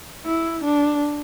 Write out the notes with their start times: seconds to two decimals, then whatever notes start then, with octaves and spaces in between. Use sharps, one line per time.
0.25 E4
0.64 D4